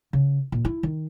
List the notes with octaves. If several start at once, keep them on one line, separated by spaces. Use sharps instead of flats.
C#3
A#2
E4
D#3